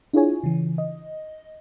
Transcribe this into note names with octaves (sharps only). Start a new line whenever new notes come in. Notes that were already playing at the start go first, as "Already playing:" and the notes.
D4 E4 F4 G#4 C#5 G#5
C#3 E3
D#5